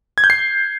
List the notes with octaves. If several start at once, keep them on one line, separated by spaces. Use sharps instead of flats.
G#6
G6
C7